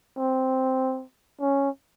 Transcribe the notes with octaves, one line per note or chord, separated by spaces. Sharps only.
C4
C#4